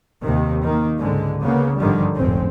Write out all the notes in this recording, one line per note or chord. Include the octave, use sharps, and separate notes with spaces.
D#2 C3 D#3
D#3 A#3
C#2 G#2 D3 G#3
C#3 A#3 B3
G#1 G2 D3 D#3 F3 G3
F1 A#1 G#2 C4 C#4